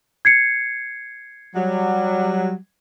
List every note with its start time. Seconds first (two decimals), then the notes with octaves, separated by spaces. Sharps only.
0.25 G#6 C7 C#7
1.56 F#3 G3